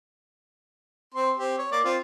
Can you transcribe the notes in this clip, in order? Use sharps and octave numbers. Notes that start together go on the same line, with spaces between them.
C4 C6
C4 G4
C#5
A#3 D5
C4 F4